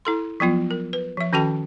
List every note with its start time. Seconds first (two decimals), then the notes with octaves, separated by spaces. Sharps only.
0.05 E4 A4 C6
0.40 F3 F#3 B3 F4
0.71 A#4
0.93 B4
1.17 F3 E5
1.33 D#3 C#4 F#4 A4 G5 A5